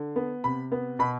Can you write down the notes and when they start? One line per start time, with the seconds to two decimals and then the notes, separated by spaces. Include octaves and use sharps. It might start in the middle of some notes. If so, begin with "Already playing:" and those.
Already playing: D3
0.16 B3
0.44 C3 B5
0.72 B3
0.99 B2 B5